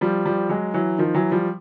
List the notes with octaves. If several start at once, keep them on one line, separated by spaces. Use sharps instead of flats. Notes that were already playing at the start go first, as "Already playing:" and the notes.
F3 G3
F3 G3
F#3 G#3
E3 F#3
D#3 F3
E3 F#3
F3 G3